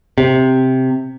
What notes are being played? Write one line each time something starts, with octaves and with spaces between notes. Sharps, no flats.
C3